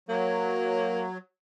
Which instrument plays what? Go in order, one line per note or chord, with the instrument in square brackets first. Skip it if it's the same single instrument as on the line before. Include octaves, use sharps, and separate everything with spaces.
[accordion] F#3 [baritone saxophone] A#3